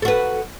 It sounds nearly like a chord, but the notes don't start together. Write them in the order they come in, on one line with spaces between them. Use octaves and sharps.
A4 F#4 B4